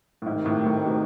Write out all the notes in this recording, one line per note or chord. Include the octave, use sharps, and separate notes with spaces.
A2
D2 G#2 C3 D#3
A2
A2
B2